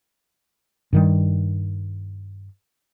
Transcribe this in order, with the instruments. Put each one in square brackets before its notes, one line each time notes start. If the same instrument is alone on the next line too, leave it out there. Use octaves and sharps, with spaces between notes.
[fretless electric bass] G2 D#3 G3